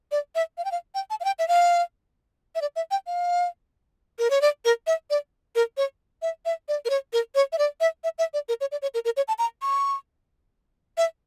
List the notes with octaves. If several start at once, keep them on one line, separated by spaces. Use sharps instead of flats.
D5
E5
F5
G5
F5
G5
A5
F5
G5
E5
F5
E5
D5
E5
G5
F5
A#4
C#5
D5
A#4
E5
D5
A#4
C#5
E5
E5
D5
A#4
C#5
A#4
C#5
E5
D5
E5
E5
E5
D5
A#4
C#5
D5
C#5
A#4
A#4
C#5
A5
A#5
C#6
E5